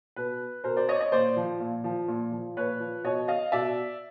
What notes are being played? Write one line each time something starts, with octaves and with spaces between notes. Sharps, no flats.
B2 B4
B2 A#4 C5
C5 D5
C#5 D#5
D5
C#5 D#5
A#2 C5 D5
F3
A#2
F3
A#2
F3
A#2 B4 C#5
F3
B2 C#5 D#5
D#5 F5
B2 D5 E5